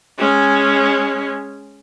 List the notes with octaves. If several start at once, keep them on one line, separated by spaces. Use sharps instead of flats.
G#3 C#4